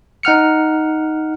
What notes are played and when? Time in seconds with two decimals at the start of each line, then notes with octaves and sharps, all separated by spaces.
0.23 D#4 F#5 F6 C#7